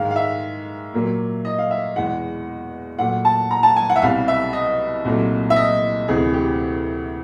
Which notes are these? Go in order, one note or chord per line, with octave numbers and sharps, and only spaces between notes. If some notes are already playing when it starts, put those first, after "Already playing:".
Already playing: G#2 D#3 G#3 F5
F5
E5
A#2 F#3 A#3
D#5
F5
E5
E2 B2 G#3 F#5
A#2 F#3 A3 F#5
A5
A#5
A5
G#5
F#5
E5
C2 B2 G3 F5
E5
D#5
C2 A#2 F#3 A3
E5
D#5
D2 C3 E3 G#4
G4